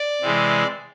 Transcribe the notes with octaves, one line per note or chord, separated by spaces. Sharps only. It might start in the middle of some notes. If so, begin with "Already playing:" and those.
Already playing: D5
C3 E3 G#3